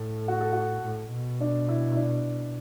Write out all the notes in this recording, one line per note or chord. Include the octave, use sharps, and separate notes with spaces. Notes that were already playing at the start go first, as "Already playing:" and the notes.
Already playing: A2 A4
F#4
A4
F#4
A2
B2
D4
E4
E4
D4